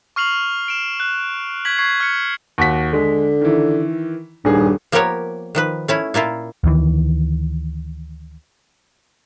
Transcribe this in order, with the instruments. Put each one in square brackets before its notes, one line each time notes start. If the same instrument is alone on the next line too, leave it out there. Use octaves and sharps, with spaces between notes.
[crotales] C#6 F6 C7 F7 F#7
D7 E7
F#6
C#6 G#6 B6 F#7
C#6 G#6 C7
F6 C#7
[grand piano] D#2 F#4 B6
[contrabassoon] D3 [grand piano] G#3
[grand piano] D#3 E3
[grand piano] D#1 D#3 G#4 [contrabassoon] G2
[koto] F3 A#3 B3 G4 A#4 C#5
D#3 F3 B4
A3 C#4 E4
A#2 A#3 E4 F4
[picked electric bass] D2 D#3 E3